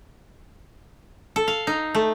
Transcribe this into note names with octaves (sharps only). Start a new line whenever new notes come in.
A4
F5
D#4
A3